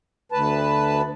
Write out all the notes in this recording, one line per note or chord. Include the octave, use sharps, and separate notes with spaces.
D2 B4 A5